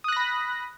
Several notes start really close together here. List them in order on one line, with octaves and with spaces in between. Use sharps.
D#6 F#6 A#6 B5